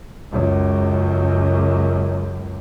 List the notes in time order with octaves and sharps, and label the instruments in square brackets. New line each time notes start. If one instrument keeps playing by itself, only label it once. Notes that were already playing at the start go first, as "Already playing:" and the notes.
[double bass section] C#2 F#2